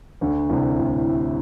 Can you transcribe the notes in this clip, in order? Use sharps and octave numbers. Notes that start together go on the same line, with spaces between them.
D2 D3
C2 C3
A2